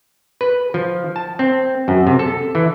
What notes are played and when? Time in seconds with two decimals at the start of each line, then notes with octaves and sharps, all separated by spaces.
0.41 B4
0.74 F3
1.16 A5
1.39 C4
1.88 F#2
2.07 C3
2.19 A4
2.55 E3